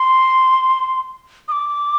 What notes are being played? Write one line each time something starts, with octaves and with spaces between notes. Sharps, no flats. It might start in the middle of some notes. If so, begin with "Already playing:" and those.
Already playing: C6
D#6
D6